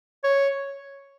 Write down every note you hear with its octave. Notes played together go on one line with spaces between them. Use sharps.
C#5